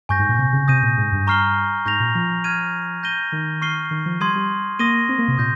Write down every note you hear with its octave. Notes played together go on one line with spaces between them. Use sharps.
G2 G#5 C#6 G6 A#6
G#2
A#2
C3
C#3
C3 D#6 G6 A#6 D#7
A#2
G#2
G2
A#5 C#6 F6 C7 G7
G#2 C#6 G6 A#6 F7
A#2
F3
F6 G#6 D#7
G6 A#6 D#7 G7
D#3
C#6 F6 C7 D#7 G7
D#3
F3
G3 C6 D#6 G#6 D#7
G3
A#3 C6 D#6 A#6 D#7 G7
C4
A#3
C3
A#2 D#6 G6 A#6